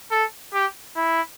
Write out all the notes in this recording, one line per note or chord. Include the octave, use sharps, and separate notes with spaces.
A4
G4
E4